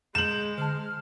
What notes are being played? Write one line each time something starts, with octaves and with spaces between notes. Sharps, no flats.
G#3 G6 E7 F#7
D3 A5 F6